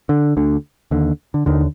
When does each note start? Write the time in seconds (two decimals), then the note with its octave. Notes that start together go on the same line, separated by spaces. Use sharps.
0.09 D3
0.37 D2 D3
0.91 D#2 D3
1.34 D3
1.46 D#2 D3 D#3